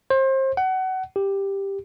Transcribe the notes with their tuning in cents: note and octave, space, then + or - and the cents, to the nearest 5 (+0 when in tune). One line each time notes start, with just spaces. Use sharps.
C5 +30
F#5 +25
G4 +5